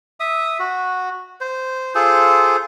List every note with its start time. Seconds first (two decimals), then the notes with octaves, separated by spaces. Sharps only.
0.20 E5 D#6
0.60 F#4
1.41 C5
1.95 F4 G#4 A4 C5